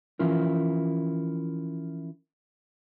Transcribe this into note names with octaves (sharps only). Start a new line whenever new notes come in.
E3 F3 C#4 E4 F4 A#4